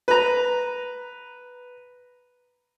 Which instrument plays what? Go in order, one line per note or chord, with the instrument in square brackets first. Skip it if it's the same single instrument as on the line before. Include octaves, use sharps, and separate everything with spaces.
[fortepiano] B4 A#5